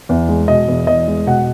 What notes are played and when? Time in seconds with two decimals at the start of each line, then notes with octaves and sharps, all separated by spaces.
0.09 E2
0.29 G#3
0.48 B2 D#5
0.68 E2
0.87 E2 D#5
1.08 G#3
1.26 B2 F#5